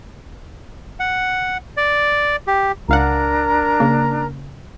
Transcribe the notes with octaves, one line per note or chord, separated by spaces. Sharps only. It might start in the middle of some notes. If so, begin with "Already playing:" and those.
F#5
D5
G4
C#2 D4 A#4 F5 F#5 A#5
C#3 A#3